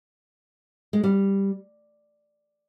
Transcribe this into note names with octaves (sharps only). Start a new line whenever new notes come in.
G#3
G3